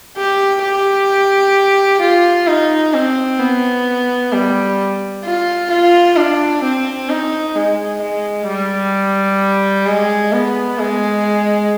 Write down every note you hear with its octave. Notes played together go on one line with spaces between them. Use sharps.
G4
G4
F4
D#4
C4
B3
G3
F4
F4
D4
C4
D#4
G#3
G#3
G3
G#3
B3
G#3